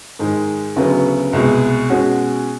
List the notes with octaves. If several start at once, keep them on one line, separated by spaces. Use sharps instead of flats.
G#2 D#3 G#3
D2 C#3 F#3 B3
C2 B2 G#3
B2 G#3 C#4 F#4